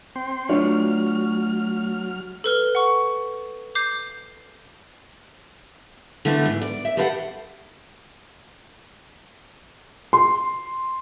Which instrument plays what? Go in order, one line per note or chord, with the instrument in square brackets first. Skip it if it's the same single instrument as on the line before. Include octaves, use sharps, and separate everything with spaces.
[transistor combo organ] C4 G5 C6
[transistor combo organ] F#3 F6 [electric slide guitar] A3 F4 F#4 [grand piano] D4 C#5
[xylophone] A4 B4 F6 G7
F#5 C#6
D6 G6 C7
[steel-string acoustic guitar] D3 E3 A3 B3
G#2
D5
E5
G4 A4 B4 C5 D#5 F#5
[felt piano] C6